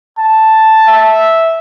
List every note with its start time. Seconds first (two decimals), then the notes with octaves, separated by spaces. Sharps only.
0.19 A5
0.88 E5